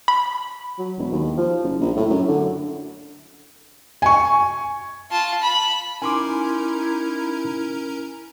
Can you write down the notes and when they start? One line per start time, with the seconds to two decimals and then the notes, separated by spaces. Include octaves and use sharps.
0.08 B5
0.78 F#3
0.98 E1
1.12 D#2
1.37 F3
1.63 F#1
1.81 A#1
1.96 A2
2.10 F#2
2.28 D3
4.02 G#5 C#6
5.11 F4 A5
5.42 B5
6.02 C#4 D#4 E4 A#4 G#5 A#5 C6 D6